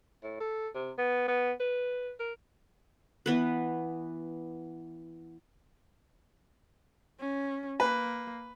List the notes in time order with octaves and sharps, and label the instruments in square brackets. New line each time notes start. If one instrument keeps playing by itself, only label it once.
[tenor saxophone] A2
A4
C3
B3
B3
B4
A#4
[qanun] E3 B3 B4
[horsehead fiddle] C#4
[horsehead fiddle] A#3 [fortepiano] B4